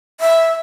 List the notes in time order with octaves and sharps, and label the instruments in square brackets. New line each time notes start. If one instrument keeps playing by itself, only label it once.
[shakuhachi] E5